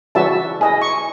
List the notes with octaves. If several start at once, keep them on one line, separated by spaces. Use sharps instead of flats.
C#3 E3 G3 F#4 E5 A5
E4 G#4 D#5
C#6